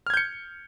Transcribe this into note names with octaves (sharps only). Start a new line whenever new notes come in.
F6 G6 G#6 C#7